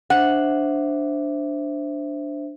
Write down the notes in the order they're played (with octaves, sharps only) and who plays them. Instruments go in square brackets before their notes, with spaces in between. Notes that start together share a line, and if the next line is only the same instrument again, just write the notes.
[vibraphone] D4 C5 E5 [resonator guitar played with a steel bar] F#5